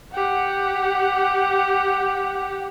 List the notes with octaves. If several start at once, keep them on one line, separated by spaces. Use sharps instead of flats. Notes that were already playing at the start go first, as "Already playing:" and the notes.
G4 F#5